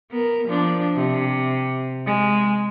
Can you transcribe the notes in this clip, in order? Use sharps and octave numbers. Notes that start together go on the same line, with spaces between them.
B3 A#4
F3 D4
C3
G#3